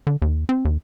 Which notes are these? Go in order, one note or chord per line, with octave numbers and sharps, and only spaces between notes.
D3
D#2
C4
D#2